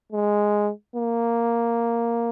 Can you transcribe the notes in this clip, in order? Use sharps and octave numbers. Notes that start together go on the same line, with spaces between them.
G#3
A#3